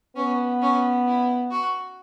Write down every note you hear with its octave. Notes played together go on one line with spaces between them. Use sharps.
B3 C#4
C#4
E4
F#4